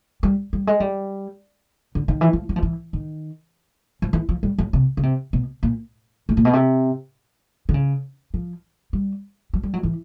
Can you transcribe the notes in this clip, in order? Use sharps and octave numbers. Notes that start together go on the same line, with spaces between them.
G3
G3
G#3
G3
D3
D#3
E3
F3
F#3
F3
E3
D#3
F3
E3
F3
G3
F#3
C3
C#3
C3
B2
A#2
A2
A#2
B2
C3
D3
C#3
F3
G3
F#3
G3
F#3
E3